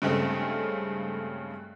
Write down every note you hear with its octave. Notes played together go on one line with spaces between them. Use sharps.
G2 C#3 G#3 A3 C4